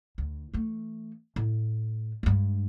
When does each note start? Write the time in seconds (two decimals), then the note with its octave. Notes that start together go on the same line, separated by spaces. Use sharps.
0.18 D2
0.54 E3 A3
1.36 A2
2.23 G2 G#3